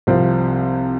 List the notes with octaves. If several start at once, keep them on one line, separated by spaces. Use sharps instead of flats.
C2 C3 F3 C4